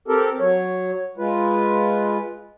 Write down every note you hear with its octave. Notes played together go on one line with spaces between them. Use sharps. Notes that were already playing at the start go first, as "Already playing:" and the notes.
C4 G4 A4 A#4
F#3 C#5
G#3 F4 B4